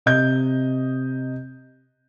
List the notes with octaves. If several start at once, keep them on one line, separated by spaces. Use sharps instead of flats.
C3 D#5 G6